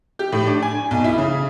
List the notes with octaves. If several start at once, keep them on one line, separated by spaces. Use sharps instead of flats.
G4
A2
D4
G#5
B1
E4
C#3